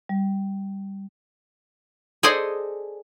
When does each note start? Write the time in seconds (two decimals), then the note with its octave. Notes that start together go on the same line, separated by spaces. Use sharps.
0.09 G3
2.23 G#4 A4 C5 D5 D#5 G#5